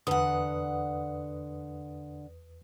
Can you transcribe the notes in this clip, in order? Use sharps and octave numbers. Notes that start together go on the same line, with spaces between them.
E2 D3 B4 F#5 D#6